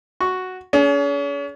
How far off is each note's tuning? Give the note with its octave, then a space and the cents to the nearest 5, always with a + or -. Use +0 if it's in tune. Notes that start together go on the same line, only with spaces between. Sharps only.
F#4 +0 C#6 +0
C#4 +40 G#4 +25